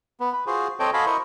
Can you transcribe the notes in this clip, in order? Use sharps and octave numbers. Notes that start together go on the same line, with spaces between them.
B3
B4
F4 F#4 G#4 C5
C4 A4 C#5 D#5 G5
F#4 A4 D#5 F5 G#5 B5
E4 A#4 C5 D#5 C#6